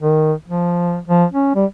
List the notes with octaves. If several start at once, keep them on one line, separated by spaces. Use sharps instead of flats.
D#3
F3
F3
C#4
G3